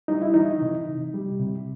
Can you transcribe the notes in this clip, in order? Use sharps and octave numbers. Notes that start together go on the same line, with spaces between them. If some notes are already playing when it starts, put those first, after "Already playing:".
G3 D#4
E4
E3 D#4
C3
C3
G3
C3